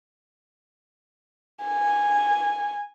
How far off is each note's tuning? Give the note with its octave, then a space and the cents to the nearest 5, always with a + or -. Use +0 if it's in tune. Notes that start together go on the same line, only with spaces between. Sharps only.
G#5 -10